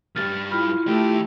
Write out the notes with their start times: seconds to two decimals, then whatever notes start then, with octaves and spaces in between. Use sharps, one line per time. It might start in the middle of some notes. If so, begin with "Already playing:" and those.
0.16 C2 G2 F6 A6
0.51 E4 F4 B5 F6
0.87 D#2 A3 G4